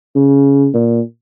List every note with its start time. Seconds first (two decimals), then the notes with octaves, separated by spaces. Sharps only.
0.16 C#3
0.74 A#2